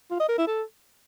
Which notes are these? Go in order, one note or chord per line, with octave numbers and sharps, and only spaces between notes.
F4
D#5
A#4
E4
A4